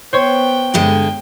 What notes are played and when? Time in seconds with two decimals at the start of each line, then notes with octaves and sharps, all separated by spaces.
0.13 B3 C5 C#5 G5
0.74 G2 D3 G#3 G5